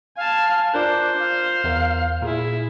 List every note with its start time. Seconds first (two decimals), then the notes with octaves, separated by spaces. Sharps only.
0.17 F5 G#5 A5
0.74 D4 F4 A#4 C5 F#6
1.19 F5
1.64 E2 A#4
2.22 A#2 E4 G#4